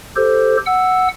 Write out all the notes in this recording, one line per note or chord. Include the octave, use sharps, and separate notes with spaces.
G4 A4 C5
F#5 E6